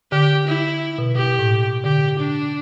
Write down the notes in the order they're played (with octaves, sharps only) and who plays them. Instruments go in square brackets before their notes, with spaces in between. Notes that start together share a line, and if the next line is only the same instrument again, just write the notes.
[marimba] D3 [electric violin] G4
[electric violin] E4
[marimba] B2
[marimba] B2 [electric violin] G4
[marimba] B2
A2
[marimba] D3 [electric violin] G4
[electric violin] D4